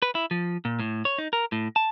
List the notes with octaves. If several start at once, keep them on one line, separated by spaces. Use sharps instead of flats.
B4
E4
F3
A#2
A2
C#5
D#4
A#4
A2
A5